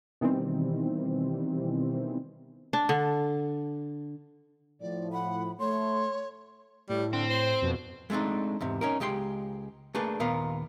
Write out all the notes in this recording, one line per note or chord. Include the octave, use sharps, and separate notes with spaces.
B2 D#3 E3 G3 C4
D4
D3
A2 F3 D5
F#5 B5
A3 C#5 C6
A2 G3
D3 C4
C5
F2 B2
G#3 A3 C4 D4 D#4
E2 G#2 C3
C#4 D#4 A#4
C#2 G#3 G4 G5 C6
A3 A#3 D4 G#4 B4
D#2 A#2 B3 A#4 F5